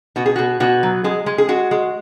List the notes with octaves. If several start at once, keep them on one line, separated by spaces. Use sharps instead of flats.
B2 F#4
G#4
B2 F#4
B2 F#4
F#3
G#3 G#4
G#3
G#4
G#3 F#4
G#3